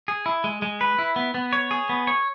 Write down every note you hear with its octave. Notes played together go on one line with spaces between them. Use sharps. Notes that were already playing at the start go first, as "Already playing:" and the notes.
G#4
E4
G#3
G#3
B4
E4
B3
B3
C#5
G#4
B3
C#5